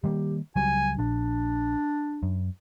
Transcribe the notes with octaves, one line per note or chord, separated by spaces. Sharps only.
D#3 G3 A#3 G4
C#2 F#3 G3 G#5
A#1 D4
F#2